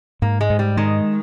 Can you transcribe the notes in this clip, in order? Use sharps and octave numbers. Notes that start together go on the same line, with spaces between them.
G#2 A#3
G#3
G#2
G3
D#3 G#3